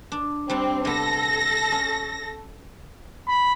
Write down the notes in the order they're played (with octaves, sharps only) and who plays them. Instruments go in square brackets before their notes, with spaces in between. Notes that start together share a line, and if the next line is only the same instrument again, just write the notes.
[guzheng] D4
[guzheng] G3 D4 [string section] C4
[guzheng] C3 B3 [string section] A4 A#6
[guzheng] C#4
[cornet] B5